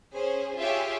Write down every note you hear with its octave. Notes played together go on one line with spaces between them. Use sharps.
C#4 G#4 C5
F4 G4 G#4 C#5 E5 F5